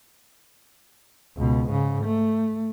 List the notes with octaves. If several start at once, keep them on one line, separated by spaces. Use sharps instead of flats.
C#2 B2
G#2 C#3
A3